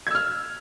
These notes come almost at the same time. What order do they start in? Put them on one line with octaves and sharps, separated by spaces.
G#6 E6 F6